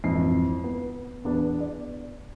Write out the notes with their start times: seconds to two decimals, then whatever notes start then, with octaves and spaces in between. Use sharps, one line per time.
0.04 G#1 F2 E3 C7
0.64 B3
1.24 E2 B3 D4
1.60 D5